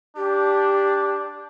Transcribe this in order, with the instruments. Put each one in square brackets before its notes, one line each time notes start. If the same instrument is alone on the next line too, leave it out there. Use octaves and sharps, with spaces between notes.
[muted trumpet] D4 [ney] G4